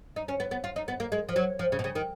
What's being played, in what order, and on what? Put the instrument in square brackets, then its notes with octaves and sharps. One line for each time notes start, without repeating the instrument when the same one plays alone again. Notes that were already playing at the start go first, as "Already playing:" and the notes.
[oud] D#4
C#4
B3
B3
F4
D#4
B3
A#3
G#3
F3
F#3
F3
C#3
B2
C#3
D#3